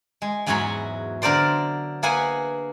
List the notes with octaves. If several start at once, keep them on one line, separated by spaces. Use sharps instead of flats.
G#3
E2 G#2 F#3 F#4 C#5 B5
D3 A#4 C5 D5 C6
A#3 G#4 B4 F#5 G#5